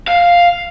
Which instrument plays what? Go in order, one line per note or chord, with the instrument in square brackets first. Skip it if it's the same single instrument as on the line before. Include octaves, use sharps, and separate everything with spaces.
[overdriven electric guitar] F5